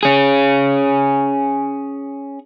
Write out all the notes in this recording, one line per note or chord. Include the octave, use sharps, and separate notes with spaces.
C#4 G#4